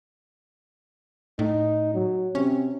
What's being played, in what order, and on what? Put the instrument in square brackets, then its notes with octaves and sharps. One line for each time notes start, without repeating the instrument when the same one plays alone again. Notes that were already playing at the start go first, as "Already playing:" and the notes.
[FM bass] A2 [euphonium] D#4
[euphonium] F#3
[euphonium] C3 [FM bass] C#4